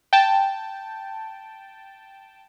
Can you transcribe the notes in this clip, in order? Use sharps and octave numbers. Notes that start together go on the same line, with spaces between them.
G5 A5